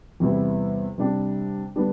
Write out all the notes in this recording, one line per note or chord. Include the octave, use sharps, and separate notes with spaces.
E2 C3 G3 B3 E4
C3 G3 D4 G4
D3 G3 B3 D4 G4